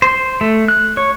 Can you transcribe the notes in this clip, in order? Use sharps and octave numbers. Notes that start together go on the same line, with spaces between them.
C5
A3
F#6
C#5